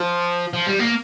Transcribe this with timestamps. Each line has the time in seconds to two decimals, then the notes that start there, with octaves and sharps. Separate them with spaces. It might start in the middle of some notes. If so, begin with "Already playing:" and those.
Already playing: F3
0.53 F3
0.67 G3
0.79 A#3